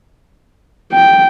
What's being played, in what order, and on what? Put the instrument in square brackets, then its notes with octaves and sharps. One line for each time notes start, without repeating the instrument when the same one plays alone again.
[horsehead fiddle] G5